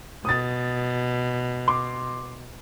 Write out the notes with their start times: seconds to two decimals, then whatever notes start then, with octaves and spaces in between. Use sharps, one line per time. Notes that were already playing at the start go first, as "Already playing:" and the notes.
0.25 B2 D#6 A6
1.68 C6 D6